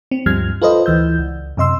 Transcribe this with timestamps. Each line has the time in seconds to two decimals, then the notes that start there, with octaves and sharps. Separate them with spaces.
0.11 C4
0.26 D2 G2 F3 G3 F6 G#6
0.62 F4 A4 B4 C5 D#5
0.86 D2 E3 E6 G6
1.19 C#2
1.57 F#2 C3 D#5 C6 E6